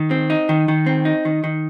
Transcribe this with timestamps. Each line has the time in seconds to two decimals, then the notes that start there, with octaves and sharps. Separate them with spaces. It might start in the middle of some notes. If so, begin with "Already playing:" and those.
Already playing: D#3
0.11 C4
0.30 D#4
0.49 D#3
0.68 D#3
0.86 C4
1.05 D#4
1.25 D#3
1.44 D#3